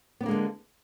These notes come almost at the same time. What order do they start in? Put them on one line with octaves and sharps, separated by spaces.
B3 D4 A#3 G#3 D3